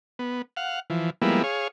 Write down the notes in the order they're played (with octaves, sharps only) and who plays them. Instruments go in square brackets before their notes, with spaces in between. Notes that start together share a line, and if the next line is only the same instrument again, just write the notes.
[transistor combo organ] B3
F5 F#5
E3 F3
F3 G3 G#3 A#3 B3 E4
G#4 C#5 F5